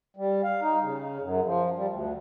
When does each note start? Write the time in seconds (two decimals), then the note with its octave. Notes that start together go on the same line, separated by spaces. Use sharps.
0.17 G3
0.44 F5
0.62 D#4
0.82 C#3
1.21 F#2
1.46 F3
1.76 G3
1.88 D2